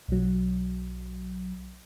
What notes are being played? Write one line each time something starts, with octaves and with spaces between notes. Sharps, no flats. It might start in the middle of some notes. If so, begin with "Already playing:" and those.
B1 F#3